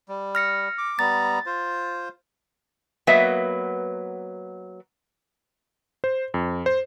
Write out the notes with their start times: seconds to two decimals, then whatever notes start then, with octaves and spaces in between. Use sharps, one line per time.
0.09 G3
0.35 F6 A#6 C#7
0.78 D6
0.99 G3 B3 A#5 A6
1.46 F4 C5
3.07 F#3 A#3 B3 B4 D#5 E5
6.04 C5
6.34 F2
6.66 C5